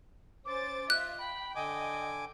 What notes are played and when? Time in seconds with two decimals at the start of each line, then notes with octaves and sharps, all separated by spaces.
0.45 C#4 C5 D6 A6
0.90 F4 D#5 E5 F#6
1.19 G5 B5
1.55 D3 D#5 G#5 D6